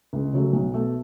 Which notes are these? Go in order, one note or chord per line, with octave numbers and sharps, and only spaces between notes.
C#2
C#3 F#3 A3
B1
B2 A3